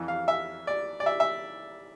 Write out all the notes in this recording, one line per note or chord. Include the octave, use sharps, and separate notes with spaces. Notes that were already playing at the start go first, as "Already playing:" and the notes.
Already playing: F2 E3
F5
E5
D5
D5
E5
E5